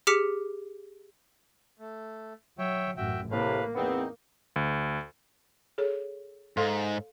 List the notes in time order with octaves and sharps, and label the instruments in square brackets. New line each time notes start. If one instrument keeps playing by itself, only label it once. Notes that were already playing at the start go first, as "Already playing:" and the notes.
[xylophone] G4 G#4 D6 F6 B6 C#7
[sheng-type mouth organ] A3
[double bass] F#3 [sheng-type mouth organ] C#5 E5 G5
[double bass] A1 F#2 [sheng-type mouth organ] F#4 E5 G5
[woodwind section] A2 C3 [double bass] A#3 [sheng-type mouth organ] B4 F5
[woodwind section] E2 B3 C4 [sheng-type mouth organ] D#4
[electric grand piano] D2
[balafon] G#4 A4 C#5
[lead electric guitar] G#2 [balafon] A4 F5 C6